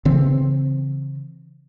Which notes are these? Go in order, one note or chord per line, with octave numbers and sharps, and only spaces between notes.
C#3 E3 C4